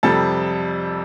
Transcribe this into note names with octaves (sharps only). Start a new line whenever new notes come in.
F2 C3 G3 A4 A5